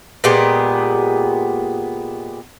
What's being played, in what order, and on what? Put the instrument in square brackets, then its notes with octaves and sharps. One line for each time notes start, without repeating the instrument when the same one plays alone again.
[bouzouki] A#2 G#3 B3 G4